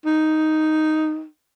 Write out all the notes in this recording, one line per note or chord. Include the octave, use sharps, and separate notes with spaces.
D#4